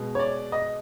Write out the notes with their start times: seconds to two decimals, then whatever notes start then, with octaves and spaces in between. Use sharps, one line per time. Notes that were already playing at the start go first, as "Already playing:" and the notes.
Already playing: B2 G#3
0.15 C#5
0.19 D5
0.52 D#5